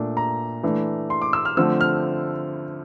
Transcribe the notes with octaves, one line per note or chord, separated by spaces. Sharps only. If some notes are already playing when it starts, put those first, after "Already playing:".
Already playing: A#2 A3 D4
A#5
E3 A3 D4
C6
D6
E6
F6
D3 F3 A3 C4 E6
F6